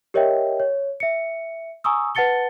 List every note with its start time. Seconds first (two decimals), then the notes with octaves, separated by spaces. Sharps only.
0.14 G4 A#4 C#5 D#5 E5 G5
0.60 C#5
1.00 E5 C#7
1.84 G#5 A#5 C#6 D#6 E6
2.15 B4 F#5 A5 A6 C#7 G7